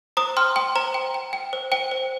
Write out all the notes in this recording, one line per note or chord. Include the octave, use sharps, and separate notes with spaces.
C5 A#5 D#6
G5 C6 F6
G5 C6
C5 A#5
G5
G5
G5
C5
C5 G5
C5